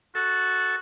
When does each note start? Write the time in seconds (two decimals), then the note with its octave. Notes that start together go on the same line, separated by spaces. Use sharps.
0.15 F#4 A4